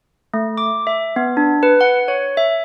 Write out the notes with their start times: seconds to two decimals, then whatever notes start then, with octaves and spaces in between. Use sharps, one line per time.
0.34 A3
0.58 D6
0.87 E5
1.16 B3
1.37 D4
1.63 B4
1.81 F#5
2.08 C#5
2.37 E5